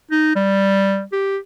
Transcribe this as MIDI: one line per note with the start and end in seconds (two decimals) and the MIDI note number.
0.11 0.35 63
0.36 1.03 55
1.12 1.37 67